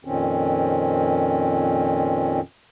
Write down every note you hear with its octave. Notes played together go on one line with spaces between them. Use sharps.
F2 A#2 D#3 C4 C#4